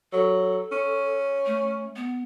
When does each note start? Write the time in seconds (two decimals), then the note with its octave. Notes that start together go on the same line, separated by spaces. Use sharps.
0.13 F#3 A4
0.72 C#4
1.46 A3
1.96 B3